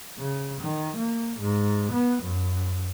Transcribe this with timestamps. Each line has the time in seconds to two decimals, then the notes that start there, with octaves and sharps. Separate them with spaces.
0.18 C#3
0.61 D#3
0.97 A#3
1.40 G#2
1.93 B3
2.23 F#2